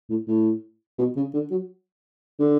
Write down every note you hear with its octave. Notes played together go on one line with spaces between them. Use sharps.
A2
A2
B2
C#3
D3
F#3
D3